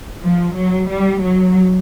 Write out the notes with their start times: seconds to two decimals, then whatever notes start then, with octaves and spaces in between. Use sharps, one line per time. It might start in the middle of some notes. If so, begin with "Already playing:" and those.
0.23 F3
0.55 F#3
0.89 G3
1.22 F#3